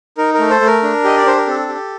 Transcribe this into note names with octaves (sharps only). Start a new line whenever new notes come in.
D#4 A#4
A#4
A3
A4 C5
A3
A#4
D4
G4 D#5
D5
D4 C5
A#4
C4 A4
G4